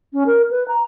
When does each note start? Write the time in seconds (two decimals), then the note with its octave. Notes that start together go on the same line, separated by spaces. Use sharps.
0.13 C#4
0.26 A#4
0.51 B4
0.68 A#5